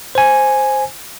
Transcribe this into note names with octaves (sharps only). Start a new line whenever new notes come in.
C5 G#5